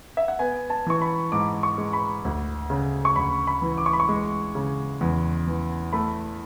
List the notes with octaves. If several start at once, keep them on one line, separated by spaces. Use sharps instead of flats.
E5
F#5
B3 G#5
A5
E3 C#6
B5
G#2 D6
C#6
G#3
B5
D2
C#3
C#6
D2 B5
B5
E3
D6
C#6
B5
C#6
G#3
C#3
E2
E3
A3 B5